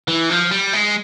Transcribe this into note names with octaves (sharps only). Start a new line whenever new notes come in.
E3
F3
G3
G#3